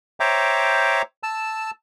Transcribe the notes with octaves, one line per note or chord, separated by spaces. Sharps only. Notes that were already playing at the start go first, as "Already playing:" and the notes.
C5 C#5 E5 G5 A#5 D6
A5 E6